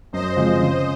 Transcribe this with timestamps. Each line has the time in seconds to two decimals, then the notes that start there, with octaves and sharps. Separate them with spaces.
0.13 F#2 C5 D#5
0.37 C#3 F3 G#3 C4
0.61 C#3